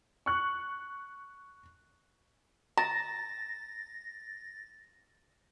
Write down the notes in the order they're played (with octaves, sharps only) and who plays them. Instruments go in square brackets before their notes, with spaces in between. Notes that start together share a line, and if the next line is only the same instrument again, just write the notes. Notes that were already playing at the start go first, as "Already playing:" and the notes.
[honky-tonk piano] C#6 F#6
[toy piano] A#5 [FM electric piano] A6 A#6